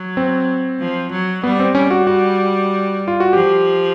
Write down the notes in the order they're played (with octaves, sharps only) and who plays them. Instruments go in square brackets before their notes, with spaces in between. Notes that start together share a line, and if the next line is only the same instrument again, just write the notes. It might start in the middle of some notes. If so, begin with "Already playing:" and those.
Already playing: [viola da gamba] F#3
[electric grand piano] C4
[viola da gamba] F3
F#3
[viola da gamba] G3 [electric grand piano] B3
[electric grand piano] C4
[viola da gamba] G3 [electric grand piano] C#4
[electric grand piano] F#4
F#4
F4
F#4
[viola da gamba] F3 [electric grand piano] G4